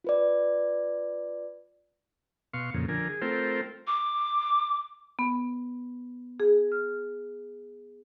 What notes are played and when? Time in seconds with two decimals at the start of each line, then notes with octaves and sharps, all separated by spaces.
0.04 F4 B4 D5
2.53 B2 F5 C6 C#6
2.74 F2 A#2 C#3
2.89 D3 F3 A#4 G#5
3.09 G#4
3.21 A3 C4 F4 A#4 C5 G5
3.87 D6
5.19 B3
6.40 G#4
6.72 F6